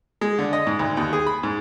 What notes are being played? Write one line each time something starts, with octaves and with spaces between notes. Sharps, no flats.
G#3
D3
D#5
G#2
D2
D#2
G#4
B5
G#2